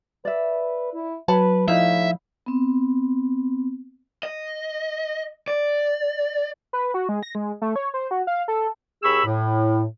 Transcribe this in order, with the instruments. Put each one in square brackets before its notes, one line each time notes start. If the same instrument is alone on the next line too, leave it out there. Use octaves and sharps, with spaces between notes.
[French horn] B4 [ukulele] D5 E5
[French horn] E4
[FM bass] F#3 [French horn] B4 [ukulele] A5 B5
[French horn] A2 [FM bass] F3 [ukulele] D#4 E4 F5 [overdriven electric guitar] E5
[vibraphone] B3 C4
[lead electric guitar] D#5
D5
[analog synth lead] B4
F#4
G#3
A#6
G#3
A3
C#5
C5
F#4
F5
A4
[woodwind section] D#2 G#4 B5 C#6 E6
A2